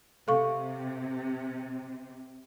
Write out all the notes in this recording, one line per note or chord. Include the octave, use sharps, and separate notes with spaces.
C3 A4 F5 C#6